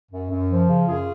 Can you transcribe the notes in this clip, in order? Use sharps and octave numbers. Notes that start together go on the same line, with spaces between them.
F#2
F#2
F3
C#3
F#2 F4 G#4